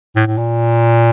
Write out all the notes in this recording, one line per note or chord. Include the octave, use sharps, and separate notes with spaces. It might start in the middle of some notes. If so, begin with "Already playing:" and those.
A2
A2
A#2